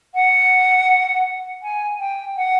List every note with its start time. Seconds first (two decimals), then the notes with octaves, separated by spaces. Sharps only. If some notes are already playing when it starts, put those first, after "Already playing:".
0.14 F#5
1.62 G#5
1.98 G5
2.36 F#5